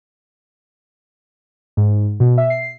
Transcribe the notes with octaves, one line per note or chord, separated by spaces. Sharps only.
G#2
B2
E5
C7